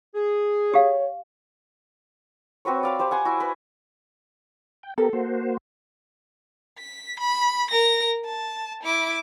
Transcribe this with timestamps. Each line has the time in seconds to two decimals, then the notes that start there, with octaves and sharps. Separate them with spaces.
0.15 G#4
0.74 G4 C#5 F5
2.65 C4 F#4 B4 C#5
2.83 D5 F5 B5
2.99 G4 C5 D5
3.11 F#5 G#5 C6
3.25 E4 F#4
3.40 B4
4.83 G5
4.98 B3 G4 A4 A#4
5.13 A#3 F#4 C5
6.79 B6
7.20 B5
7.71 A#4 A#6
8.25 A5
8.84 E4 D6